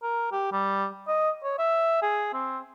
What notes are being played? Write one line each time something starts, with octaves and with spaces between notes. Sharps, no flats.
A#4
G4
G3
D#5
C#5
E5
G#4
C4